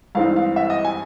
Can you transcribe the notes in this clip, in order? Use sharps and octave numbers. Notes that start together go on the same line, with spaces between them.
G2 E3 G#3 C4 D#4 F5
F5
E5
D#5
G#5